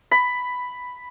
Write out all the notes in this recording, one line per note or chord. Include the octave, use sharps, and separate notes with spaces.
B5